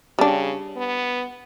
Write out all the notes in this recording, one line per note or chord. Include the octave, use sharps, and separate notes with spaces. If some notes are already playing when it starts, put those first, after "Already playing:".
C#3 G3 D4
B3